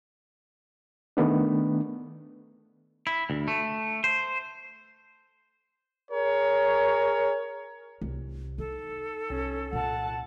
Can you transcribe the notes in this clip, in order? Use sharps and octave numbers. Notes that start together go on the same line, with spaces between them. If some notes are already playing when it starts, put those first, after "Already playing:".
D#3 A3 B3 D4
E4
D2
A3
C5
G#4 A#4 C#5
C2
D#4 A4
C2 C#4
A#2 F#5 A5